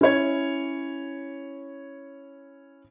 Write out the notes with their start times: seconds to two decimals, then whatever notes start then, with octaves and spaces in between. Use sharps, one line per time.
0.01 C#4 E4 C#5 G#6